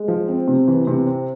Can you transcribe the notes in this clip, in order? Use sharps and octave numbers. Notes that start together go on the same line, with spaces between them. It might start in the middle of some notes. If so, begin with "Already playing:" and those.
Already playing: G#3
F3
C4
C3
E3
C3
C4